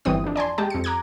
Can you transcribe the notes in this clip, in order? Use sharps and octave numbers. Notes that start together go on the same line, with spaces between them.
G1 E3 G3 C4 D#6
F2 D4
D5 G#5 A5 C6
G#3 G4 A5
F2 C#7
A#5 D6 F#6 G#6